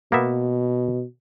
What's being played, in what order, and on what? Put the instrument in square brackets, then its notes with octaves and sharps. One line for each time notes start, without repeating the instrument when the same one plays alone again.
[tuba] B2 [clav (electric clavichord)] A#3 B3 E5